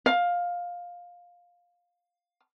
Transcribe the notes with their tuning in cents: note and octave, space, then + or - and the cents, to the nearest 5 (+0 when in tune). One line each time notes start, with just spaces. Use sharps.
F5 +15